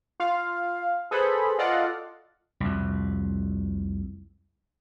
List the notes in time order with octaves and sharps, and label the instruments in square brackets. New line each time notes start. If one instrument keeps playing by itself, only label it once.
[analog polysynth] F4 F5
G#4 A4 B4 C5 B5
F4 A4 D5 D#5 F5 F#5
[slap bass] C2 F2